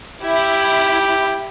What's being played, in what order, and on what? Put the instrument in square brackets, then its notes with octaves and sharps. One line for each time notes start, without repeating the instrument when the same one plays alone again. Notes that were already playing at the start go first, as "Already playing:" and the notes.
[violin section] E4 [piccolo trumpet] G4